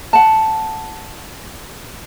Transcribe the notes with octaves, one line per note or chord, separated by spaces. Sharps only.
F#5 A5